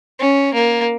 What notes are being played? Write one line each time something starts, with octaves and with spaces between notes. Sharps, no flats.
C#4
A#3